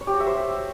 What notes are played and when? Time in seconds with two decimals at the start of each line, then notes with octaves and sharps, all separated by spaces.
0.01 C#5
0.07 G4
0.14 F#4
0.20 E5
0.27 C5